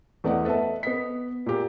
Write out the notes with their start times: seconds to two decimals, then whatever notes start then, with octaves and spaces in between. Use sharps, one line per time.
0.24 E2 A3 B3 D5 D#5 F#5
0.45 A4 B4 D#5 E5 A5
0.83 B3 D#5 B6
1.46 A#2 G4